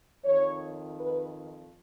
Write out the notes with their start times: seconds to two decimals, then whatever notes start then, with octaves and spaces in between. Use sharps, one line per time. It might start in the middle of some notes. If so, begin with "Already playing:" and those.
0.25 F2 D#3 C#5
0.98 B4